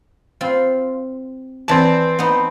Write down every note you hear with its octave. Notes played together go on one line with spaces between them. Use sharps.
C4 F4
E3 C4 D5 A5
B3 D#4